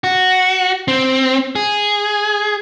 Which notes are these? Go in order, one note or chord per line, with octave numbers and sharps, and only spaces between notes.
F#4
C4
G#4